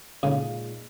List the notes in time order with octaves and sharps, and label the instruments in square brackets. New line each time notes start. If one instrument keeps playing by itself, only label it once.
[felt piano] A#2 G#3 D#4 G#4 [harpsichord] C#3